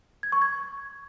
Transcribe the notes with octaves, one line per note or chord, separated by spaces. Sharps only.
G#6
C#6
G#6